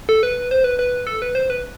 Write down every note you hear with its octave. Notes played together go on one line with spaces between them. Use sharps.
A4
B4
C5
B4
B4
A4
B4
C5
B4